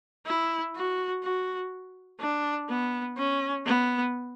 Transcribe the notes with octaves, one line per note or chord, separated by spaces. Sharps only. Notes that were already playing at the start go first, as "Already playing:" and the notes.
E4
F#4
F#4
D4
B3
C#4
B3